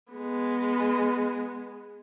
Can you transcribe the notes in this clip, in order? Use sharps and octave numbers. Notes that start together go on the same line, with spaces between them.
G#3 B3